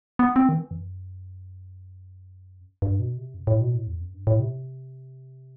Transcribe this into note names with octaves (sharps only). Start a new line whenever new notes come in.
B3
C4
D#3
E3
F#2
G2
B2
C3
F#2
A2
B2
A2
E2
F#2
G2
A2
C3